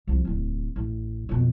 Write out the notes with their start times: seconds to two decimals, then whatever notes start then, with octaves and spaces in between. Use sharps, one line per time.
0.07 C2 F3
0.25 D1 E2
0.76 A1
1.29 F2 B2